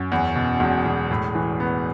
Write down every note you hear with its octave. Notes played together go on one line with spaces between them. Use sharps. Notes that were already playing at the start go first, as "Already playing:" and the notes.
Already playing: F#2
E2
B2
E1
E1
A2
E3
B3